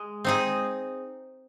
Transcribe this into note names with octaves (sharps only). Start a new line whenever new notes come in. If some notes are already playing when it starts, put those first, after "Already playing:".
Already playing: G#3
C4 D#4 G#4